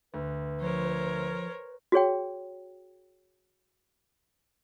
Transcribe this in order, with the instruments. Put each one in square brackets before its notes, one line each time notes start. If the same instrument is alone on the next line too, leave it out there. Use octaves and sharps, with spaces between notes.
[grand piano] D2 [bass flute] B4
[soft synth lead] F3 [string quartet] A#4 C5 C#5
[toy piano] F#4 G#4 C#5 G5